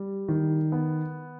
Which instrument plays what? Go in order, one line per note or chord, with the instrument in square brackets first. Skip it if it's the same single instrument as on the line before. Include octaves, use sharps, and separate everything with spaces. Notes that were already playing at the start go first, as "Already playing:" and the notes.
Already playing: [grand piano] G3
D#3
B3